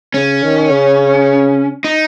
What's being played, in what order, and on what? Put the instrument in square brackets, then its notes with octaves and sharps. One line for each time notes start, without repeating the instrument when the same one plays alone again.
[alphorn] C#3 [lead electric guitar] C#4
[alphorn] D#3
C#3
[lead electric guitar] D#4